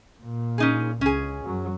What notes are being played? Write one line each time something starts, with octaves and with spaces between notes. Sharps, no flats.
A#2
C#4 D#4 G#4
C#2 C#4 G#4
F#2 F#3